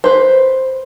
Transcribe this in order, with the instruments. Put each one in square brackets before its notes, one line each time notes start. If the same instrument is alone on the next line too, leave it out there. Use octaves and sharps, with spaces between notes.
[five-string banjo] B4 C5